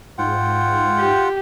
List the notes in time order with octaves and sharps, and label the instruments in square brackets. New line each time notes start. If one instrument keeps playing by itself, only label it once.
[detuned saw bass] G#2 [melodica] F4 F#5 G5
[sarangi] G4